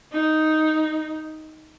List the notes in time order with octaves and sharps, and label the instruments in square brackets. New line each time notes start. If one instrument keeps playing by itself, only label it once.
[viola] D#4